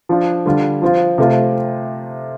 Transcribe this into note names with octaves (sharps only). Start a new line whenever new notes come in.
F3 D4 F4
D3 G3 F4
F3 C4 F4
C3 A3 C4 F4